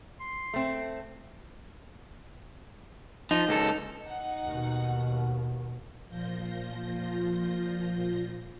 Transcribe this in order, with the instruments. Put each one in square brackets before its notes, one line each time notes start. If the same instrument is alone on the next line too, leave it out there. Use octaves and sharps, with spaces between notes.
[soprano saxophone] C6
[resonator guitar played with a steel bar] A3 C4
[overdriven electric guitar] F3 [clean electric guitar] D#4
[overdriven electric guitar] C#2 A4
[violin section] D#4 F#5
[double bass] D#2 B2
[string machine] A#2 F3 F4 G6 A#6